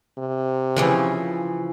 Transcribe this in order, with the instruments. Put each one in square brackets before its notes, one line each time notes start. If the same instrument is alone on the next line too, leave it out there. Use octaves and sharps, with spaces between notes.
[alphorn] C3
[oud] C#3 E3 F3